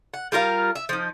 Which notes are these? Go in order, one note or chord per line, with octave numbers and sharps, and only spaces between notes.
F#5
G3 F4 A#4 F5
E5
F3 D#4